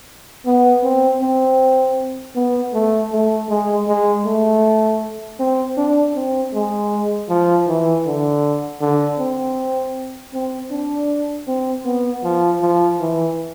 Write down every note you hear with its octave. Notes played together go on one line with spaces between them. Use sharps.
B3
C4
C4
B3
A3
A3
G#3
G#3
A3
C4
D4
C4
G#3
F3
E3
D3
D3
C4
C4
D4
C4
B3
F3
F3
E3